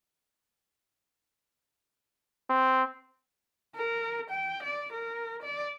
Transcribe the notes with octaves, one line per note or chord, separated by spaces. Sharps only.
C4
A#4
G5
D5
A#4
D5